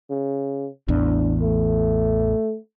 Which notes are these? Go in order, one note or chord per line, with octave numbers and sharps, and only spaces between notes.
C#3
A1 E2 D4
A3